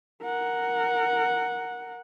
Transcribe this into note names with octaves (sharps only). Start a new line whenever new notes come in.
A#4 F#5